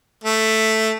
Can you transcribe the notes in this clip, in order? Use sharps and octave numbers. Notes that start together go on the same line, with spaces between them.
A3